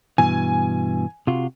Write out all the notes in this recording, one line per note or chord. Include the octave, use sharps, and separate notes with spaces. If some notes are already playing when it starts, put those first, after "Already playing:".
G2 B2 E3 G#5
C3 F4 F#4